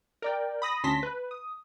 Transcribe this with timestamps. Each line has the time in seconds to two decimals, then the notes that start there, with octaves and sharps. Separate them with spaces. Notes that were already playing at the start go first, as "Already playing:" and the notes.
0.22 A#4 D5 G5
0.62 B5 D#6 A#6
0.84 D2 C#4 A5 C6 A#6 B6
1.03 B4
1.31 D#6